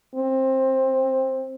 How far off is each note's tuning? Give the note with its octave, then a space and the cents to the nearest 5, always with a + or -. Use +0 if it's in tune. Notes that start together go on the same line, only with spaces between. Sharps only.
C4 +15